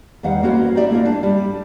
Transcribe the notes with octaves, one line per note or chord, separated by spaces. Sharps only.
E2 D#3 G3 F5 F#5
A#3 B3 C#4 F#4 A#4 C5
D#4 G4 D5 E5
A3 A#3 C#4 F4
D4
G3